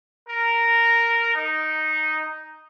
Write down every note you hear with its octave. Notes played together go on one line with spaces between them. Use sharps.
A#4
D#4